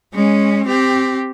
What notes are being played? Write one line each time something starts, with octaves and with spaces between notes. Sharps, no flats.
G#3 C#4
C4 G4